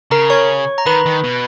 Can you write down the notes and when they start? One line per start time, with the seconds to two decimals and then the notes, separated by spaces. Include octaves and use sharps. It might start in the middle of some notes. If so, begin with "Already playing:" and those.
0.11 C#3 A#4 A#5
0.30 C#5 C#6
0.78 A#5
0.86 D#3 B4 B5
1.06 D#3
1.24 B2